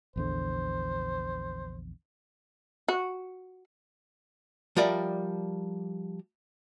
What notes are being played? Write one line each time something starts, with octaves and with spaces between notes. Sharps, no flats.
A#1 E2 D3 C5
F#4
F3 G3 A#4 D5 E5